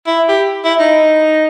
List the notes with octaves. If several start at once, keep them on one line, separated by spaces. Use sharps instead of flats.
E4
G4
E4
D#4